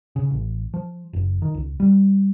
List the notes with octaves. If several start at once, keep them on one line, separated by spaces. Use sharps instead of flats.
C#3
A1
F3
F#1
D#3
C#2
G3